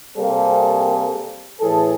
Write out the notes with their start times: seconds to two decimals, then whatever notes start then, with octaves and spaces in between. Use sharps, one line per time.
0.17 C3 G3 A#3 C4 G#4 A4
1.60 A2 E3 G#4 A4